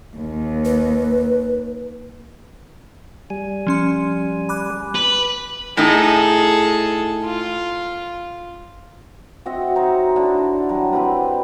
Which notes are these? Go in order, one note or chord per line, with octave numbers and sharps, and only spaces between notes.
D#2
B4
G3 G#5
F3 C#4 C6
B5 D6 F#6
B4
A2 D#4 G#4 A4
F4
C4 F#4 D#5 E5
D#4 C5 C#5
D3 D4 E4
F#3 G3
C4 E4 G4 B4